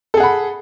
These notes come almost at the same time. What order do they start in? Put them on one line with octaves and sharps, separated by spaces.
A4 G#4 F#5 B5